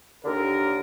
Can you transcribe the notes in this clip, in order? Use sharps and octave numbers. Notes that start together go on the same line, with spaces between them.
D#2 D3 A#4